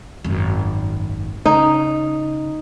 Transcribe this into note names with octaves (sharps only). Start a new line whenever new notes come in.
G#1 F#2
C#3 D#4